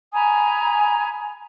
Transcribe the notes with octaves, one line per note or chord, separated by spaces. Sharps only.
G#5 A#5 B5 D#6